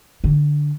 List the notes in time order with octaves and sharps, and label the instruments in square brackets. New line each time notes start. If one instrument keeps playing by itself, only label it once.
[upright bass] D3